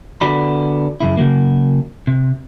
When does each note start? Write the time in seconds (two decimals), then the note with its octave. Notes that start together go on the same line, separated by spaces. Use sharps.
0.21 D3 B3 F#4 D5 B5
1.00 F#2 C#3 E4
1.17 C#3 F3 F#3 A#3
2.07 C3